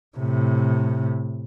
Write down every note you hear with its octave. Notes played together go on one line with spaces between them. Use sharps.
A2 C3